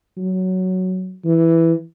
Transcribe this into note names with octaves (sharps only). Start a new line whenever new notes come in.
F#3
E3